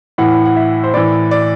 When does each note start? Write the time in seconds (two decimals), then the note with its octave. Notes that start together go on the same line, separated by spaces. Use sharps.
0.18 A2 E3 F#5
0.46 F#5
0.56 E5
0.84 C5
0.94 A2 E3 D5
1.31 D5